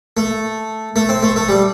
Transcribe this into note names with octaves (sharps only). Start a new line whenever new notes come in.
A3
A3
C4
A3
A3
G3